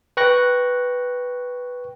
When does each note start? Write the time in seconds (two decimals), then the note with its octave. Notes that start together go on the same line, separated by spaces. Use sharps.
0.17 B4 G5 C#6 F#6 A#6